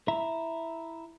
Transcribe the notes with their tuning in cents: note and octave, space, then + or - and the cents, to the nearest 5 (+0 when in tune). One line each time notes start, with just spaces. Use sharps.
E4 +0 E5 +0 A#5 +0